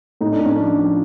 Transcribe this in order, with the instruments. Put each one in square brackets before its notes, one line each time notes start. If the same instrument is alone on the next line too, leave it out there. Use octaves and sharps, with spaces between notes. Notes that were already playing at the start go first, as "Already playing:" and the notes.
[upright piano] A2 D#4
D4
A2
C#4
F3 D4
F3